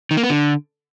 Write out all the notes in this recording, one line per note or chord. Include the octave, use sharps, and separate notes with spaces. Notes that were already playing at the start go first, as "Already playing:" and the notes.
D#3
A#3
B3
D3